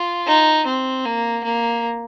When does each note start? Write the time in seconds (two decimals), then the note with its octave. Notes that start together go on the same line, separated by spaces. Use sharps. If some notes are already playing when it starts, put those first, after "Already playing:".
Already playing: F4
0.27 D#4
0.66 C4
1.05 A#3
1.44 A#3